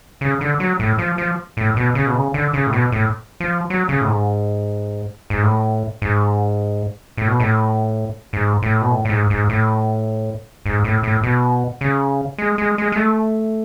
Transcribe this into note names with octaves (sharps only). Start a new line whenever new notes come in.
C#3
D3
F#3
A2
F3
F3
A2
B2
C#3
B2
C#3
D3
C#3
A2
B2
A2
F3
F#3
C#3
A2
G#2
G#2
A2
G#2
A2
B2
A2
G#2
A2
B2
A2
A2
G#2
G#2
A2
G#2
A2
A2
B2
C#3
G#3
G#3
G#3
G#3
A3